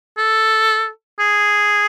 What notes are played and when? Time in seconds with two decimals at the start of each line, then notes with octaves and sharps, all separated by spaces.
0.17 A4
1.19 G#4